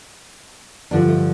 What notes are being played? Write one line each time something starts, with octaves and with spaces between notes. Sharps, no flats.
G2 D3 F3 D4
A3